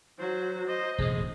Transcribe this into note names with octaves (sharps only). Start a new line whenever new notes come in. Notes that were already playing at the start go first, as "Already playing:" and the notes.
F#3 F#4 C5
C5 D#5
E1 A2 D3 G#4